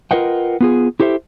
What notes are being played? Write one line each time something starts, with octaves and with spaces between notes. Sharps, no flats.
F4 A#4 B4 D#5 F#5 G5
B3 F4 G#4
E4 G4 A4 C5 E5